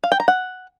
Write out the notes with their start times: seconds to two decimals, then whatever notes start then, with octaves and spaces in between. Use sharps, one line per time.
0.04 F5
0.12 G5
0.20 A#5
0.28 F#5